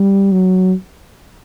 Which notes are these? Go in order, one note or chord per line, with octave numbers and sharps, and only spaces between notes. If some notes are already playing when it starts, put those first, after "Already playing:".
Already playing: G3
F#3